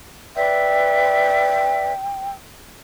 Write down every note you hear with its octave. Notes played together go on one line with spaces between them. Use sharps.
B4 D5 E5 G5